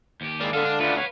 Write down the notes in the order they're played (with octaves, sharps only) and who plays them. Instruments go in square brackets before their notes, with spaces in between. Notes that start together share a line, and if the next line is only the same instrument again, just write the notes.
[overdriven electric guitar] D#2 G4
[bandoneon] G#3 D5 [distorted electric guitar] A#3 E4
[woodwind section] D3 [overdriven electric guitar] G#3 [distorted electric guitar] B3 A4 [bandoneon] F5 F6
[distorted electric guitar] D4
[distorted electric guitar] D2 [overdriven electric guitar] C#4 B4 [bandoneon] F4 D5 F#5
[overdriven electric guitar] B4 F5 [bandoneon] C#5 F#5